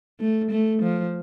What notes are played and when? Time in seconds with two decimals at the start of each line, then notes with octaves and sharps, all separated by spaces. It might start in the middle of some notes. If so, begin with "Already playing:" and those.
0.20 A3
0.51 A3
0.82 F3